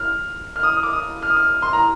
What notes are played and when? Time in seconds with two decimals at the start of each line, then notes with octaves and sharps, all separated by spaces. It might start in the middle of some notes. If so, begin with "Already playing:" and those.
Already playing: F6
0.56 F6
0.63 D#6
0.73 D#6
0.83 D6
0.93 D#6
1.22 F6
1.30 D#6
1.37 F6
1.62 C6
1.73 A#5